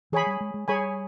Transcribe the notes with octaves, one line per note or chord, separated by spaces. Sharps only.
E3 G#4 C#5 G#5 B5
G3
G#3
G#3
G3 G#4 C#5 G#5 B5